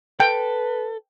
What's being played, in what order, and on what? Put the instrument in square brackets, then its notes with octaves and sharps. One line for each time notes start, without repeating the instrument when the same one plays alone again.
[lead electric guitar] A4 [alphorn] B4 [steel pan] G5